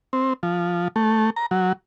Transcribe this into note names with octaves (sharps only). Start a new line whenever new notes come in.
C4
F3
A3
A#5
F#3